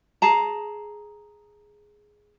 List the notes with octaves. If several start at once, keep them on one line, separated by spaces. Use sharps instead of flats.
G#4 A5 A#5